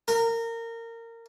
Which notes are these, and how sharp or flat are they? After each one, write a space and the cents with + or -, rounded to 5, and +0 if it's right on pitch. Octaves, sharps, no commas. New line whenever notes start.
A#4 -20